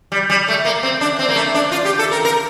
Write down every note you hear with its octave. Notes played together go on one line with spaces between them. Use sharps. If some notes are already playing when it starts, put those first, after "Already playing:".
G3
G3
A3
A#3
C4
D4
C4
A#3
A3
D4
F4
G4
A4
A#4
A#4